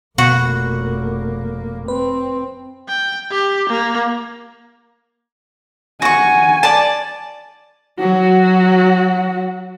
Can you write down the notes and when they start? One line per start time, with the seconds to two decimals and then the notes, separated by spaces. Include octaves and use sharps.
0.18 F1 B2 A#3 F#4
1.88 C4 B4
2.88 G5
3.31 G4
3.69 A#3
6.02 F#4 G#5 C#6
6.63 D5 A5
7.99 F#3 F#4